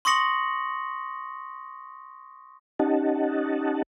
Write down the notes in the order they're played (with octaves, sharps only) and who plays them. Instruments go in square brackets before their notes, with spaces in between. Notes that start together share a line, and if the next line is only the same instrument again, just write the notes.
[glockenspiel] C6 C#6 D#6 A#6 C#7 F#7
[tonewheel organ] C#4 D#4 G4 D#5 F#5 A5